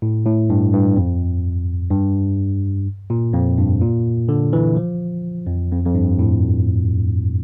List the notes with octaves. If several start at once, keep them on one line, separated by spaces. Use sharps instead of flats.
A2
A2
G2
G2
F2
G2
A#2
F2
G2
A#2
D3
E3
F3
F2
F2
F2
G2
A2